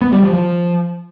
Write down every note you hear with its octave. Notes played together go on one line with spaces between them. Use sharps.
B3
G3
F3
F3